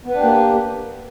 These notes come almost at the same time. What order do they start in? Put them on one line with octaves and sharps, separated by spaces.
B3 B4 D4 G4 A#3